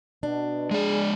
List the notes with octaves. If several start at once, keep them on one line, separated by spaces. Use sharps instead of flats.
B2 D4
G#3 G#4 D5